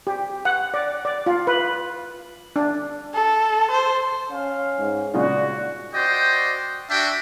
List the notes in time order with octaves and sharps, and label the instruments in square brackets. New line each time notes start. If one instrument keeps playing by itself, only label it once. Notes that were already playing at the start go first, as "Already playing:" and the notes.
[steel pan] G4
F#5
D5
D5
F4
B4
D4
[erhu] A4
C5
[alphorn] C#4 [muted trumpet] F5
[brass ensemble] G#2
[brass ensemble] G2 D5 [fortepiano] A#2 C#3 G#3 [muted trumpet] F#4
[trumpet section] F#4 C5 D5 D#5 G5
D4 F#4 E5 G5